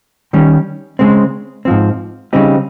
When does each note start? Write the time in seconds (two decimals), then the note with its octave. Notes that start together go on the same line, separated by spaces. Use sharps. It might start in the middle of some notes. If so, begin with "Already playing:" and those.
0.33 D#3 G3 C#4
0.99 C#3 G#3 C4
1.65 G#2 F3 C4
2.33 C#3 G3 C4 D#4 G4